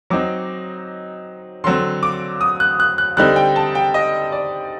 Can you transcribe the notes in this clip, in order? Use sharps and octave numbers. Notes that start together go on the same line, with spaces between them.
F#3 C4 D#4 D6
D3 F#3 C4 C6
D6
D#6
F#6
F#6
F#6
D3 G3 C4 D#4 F#6
G5
A5
G5
D#5
D5